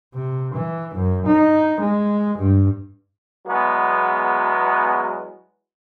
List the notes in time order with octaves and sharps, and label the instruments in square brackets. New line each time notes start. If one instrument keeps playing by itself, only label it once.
[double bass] C3
E3
F#2
D#4
G#3
G2
[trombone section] E2 F#3 G#3 B3